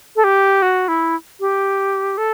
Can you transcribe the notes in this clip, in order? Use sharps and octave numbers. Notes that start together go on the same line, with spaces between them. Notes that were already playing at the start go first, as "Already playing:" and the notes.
A4
G4
F#4
E4
G4
A4